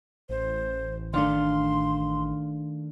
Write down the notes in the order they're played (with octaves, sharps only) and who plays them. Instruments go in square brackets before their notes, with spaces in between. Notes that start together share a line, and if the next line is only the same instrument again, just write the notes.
[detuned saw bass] A1 [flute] C5
[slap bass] D#3 A3 [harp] D4 F5 [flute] C6